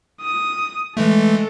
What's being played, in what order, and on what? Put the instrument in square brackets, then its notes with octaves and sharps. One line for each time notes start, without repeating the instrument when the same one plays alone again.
[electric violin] D#6
[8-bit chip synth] E3 G#3 A3 [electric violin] A4